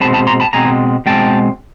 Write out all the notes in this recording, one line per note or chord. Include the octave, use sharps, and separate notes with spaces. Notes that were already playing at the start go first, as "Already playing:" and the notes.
B2 G#3 C4 A5 B5
A5 B5
A#5 C6
A5 B5
B2 G#3 C4 G#5 A#5
B2 G#3 C4 G5 A5